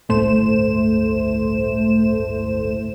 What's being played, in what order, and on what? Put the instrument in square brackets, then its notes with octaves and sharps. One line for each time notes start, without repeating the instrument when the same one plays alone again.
[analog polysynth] G1 C#2 A2 A3 C5 E7